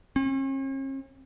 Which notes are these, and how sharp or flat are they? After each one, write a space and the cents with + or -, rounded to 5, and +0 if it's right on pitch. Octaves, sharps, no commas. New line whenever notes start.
C#4 -45